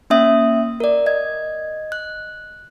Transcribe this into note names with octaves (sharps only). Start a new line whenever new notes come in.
A#3 C#4 E5 D#6
A#4 D5
D#5 G#6
F#6